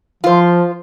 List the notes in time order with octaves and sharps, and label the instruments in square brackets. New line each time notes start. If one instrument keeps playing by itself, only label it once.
[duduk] F3 [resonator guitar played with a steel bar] F4 C5